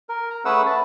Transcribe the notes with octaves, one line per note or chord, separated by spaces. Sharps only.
A#4
A#5
A3 C#4 G#4 B4 F#5 E6
B4 A5